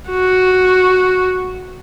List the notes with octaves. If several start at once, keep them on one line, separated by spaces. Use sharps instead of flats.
F#4